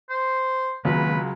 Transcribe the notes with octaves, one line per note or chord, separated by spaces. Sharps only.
C5
C#2 D#3 F#3 A#3 C4 B4